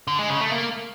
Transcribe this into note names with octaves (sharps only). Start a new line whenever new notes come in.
D3
G#3
C#3
A3
A#3